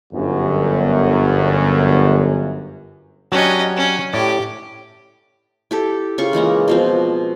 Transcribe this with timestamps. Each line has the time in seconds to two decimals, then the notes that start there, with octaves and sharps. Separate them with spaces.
0.13 G1 F#2
3.32 F#3 C#4 D4 G4 D#5
3.77 C#4
4.13 A2 G4 D5
5.71 E4 G4 A4
6.18 C#3 F4 C#6
6.33 E3 G#3 A#3 A#5
6.68 B2 F3 C4